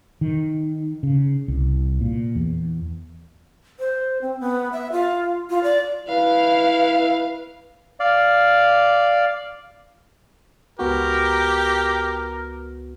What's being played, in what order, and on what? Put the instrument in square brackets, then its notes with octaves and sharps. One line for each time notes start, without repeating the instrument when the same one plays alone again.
[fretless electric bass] D#3
C#3
C2
A#2
E2
[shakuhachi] C5
C4
B3
E5
F4
F4
D5
[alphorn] E4 [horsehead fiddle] B4 [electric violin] F5
[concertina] D5 F5
[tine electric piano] C#2 B3 F#4 [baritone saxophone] G4 [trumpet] A#4